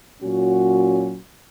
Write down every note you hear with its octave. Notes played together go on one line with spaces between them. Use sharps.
A#2 F#3 C#4 F#4